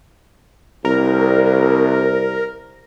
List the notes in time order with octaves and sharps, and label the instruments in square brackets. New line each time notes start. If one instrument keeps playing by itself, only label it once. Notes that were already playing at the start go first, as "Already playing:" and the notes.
[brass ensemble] C2 [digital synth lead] A#4